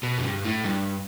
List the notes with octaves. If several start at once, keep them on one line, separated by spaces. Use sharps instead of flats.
B2
F2
G2
A2
G2